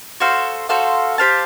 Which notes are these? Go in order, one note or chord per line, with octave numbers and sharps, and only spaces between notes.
F#4 A4 C5 F5
F#4 A4 C5 F5
G4 C5 F5 A5